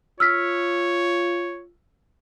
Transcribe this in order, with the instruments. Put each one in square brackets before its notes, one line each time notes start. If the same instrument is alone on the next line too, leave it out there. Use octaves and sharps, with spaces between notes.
[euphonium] F4 [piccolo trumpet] C#5 [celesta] E6 F6 B6